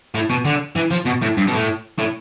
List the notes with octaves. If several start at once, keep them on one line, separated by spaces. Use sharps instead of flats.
A2
B2
D3
E3
F3
B2
A2
G2
B2
A2
A2